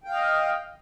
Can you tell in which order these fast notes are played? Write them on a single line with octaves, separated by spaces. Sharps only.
G5 F5 D#5